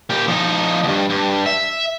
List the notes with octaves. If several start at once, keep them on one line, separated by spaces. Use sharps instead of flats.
A#2 G4
F3 D#4
D2 G2
G2
E5